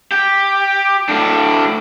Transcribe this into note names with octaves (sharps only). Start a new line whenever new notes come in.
G4
A2 D4